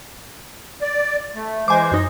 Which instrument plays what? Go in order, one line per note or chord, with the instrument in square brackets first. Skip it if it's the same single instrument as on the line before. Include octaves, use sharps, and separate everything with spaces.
[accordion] D5
A3
[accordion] E3 G#3 C5 [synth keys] G#5 D6
[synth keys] F#2 D#4 A#6